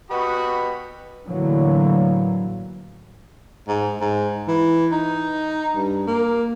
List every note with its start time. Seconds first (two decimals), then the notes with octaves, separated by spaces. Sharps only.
0.11 B2 F#4 G4 B5 D#6
1.26 A2 D3 E3 F#3 A#3
3.68 G#2
4.00 G#2
4.48 E3
4.92 D#4
5.76 G2
6.07 A#3